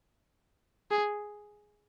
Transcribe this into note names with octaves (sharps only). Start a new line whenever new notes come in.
G#4